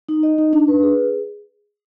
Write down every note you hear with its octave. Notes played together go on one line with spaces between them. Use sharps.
D#4
D#5
D#4
D4
B4
G#4